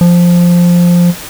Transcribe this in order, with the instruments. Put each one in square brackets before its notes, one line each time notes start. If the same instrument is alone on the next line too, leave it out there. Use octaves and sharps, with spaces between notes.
[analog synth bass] F3